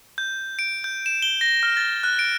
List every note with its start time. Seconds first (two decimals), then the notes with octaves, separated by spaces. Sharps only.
0.18 G6
0.59 D7
0.84 G6
1.06 E7
1.22 G7
1.41 A#6
1.63 F6
1.77 A6
2.03 F#6
2.19 D7